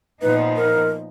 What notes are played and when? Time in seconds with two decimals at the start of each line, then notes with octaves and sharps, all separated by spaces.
0.22 A#2 F3 B3 D#4 B4
0.57 A#4